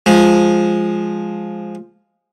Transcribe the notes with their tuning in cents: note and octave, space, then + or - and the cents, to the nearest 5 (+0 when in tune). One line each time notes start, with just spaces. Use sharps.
F3 +0 G#3 +0